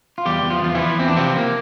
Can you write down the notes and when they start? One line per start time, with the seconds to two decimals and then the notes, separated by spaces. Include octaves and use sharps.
0.18 F4
0.25 E2 G3 G4
0.43 E2
0.50 F3 F4
0.62 E2 F4
0.75 E3 E4
0.81 F3
0.99 E2 C4
1.08 D4
1.17 C3 F3 C4
1.37 A#3